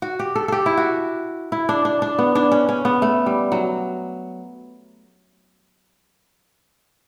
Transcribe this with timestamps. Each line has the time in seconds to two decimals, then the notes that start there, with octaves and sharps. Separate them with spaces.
0.02 F#4
0.19 G4
0.35 A4
0.48 G4 A4
0.66 E4
0.77 F#4
1.52 E4
1.69 D4
1.85 D4
2.02 D4
2.19 B3
2.35 D4
2.52 C#4
2.69 C#4
2.85 B3
3.02 A3
3.26 G3
3.52 F#3